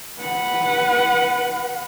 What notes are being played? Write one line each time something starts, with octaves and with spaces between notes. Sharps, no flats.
B4 F#5